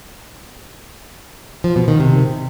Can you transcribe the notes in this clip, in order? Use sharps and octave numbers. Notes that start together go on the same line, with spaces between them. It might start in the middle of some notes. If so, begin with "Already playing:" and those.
F3
B2
D#3
C3